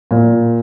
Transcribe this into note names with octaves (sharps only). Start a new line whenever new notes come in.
A#2